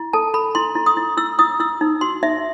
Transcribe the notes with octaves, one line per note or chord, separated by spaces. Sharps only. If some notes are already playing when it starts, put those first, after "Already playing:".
Already playing: E4
A4 A5
A4 B5
E4 C6
E4
D#6
E4
E4 E6
E4 D#6
E4 E6
D#4
F#4 C6
D#4 E5